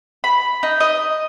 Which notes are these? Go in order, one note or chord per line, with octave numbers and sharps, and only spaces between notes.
B5
D#4
D#5